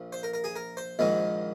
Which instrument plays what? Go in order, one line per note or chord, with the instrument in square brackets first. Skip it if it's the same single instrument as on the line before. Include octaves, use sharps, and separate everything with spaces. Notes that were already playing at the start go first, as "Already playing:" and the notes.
Already playing: [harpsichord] A#1 F3
C5
A#4
A#4
G#4
A#4
C5
A#1 G#2 D#3 G#3